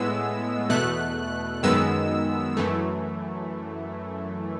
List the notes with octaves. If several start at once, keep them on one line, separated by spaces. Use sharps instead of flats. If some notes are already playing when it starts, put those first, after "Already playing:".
Already playing: A2 G#3 B3 E6
E2 B2 A3 F#6
F#2 D#3 G#3 B3 E6
F#2 E3 A3